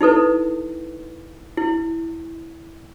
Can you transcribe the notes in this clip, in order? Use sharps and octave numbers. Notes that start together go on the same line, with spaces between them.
D#4 E4 A4 B4
E4